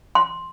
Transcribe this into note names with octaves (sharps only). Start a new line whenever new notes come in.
C6